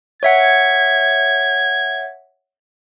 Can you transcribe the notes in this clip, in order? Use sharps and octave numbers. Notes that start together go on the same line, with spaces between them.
C#5 E5 F#5 G#6